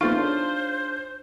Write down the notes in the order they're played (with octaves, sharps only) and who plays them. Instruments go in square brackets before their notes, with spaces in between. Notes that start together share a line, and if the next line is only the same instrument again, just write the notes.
[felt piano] B3 A4 E5 [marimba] D#4 C6 A6 [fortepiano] F4 [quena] C5
[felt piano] D4 G#4 C#5